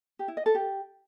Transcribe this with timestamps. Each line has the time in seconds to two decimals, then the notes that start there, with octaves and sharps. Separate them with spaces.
0.19 G4
0.28 E4
0.37 D#5
0.46 A4
0.55 G4